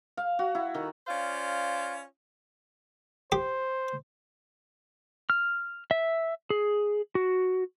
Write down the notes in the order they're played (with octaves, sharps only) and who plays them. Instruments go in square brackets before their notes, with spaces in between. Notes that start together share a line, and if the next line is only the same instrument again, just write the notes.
[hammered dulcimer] F5
F#4
E4
D#3
[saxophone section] C#4 F4 C5 D5 F5
[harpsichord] G4 [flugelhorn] C5
[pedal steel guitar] F6
E5
G#4
F#4